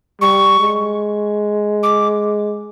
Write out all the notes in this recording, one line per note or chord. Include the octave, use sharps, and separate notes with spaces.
G3 C#6
G#3
D6